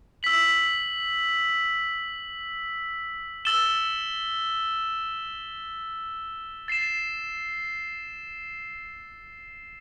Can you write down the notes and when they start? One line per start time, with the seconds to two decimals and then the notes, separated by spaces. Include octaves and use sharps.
0.23 E6 B6 F#7
3.45 E6 A6 E7 G7
6.68 A6 C7 E7